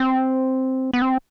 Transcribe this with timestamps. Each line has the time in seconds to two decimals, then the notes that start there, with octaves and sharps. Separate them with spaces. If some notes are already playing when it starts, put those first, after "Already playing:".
Already playing: C4
0.93 B3
1.02 C4